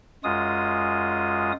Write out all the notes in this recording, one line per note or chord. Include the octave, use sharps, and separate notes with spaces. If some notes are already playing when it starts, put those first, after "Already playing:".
F#2 G#3 F4 D#6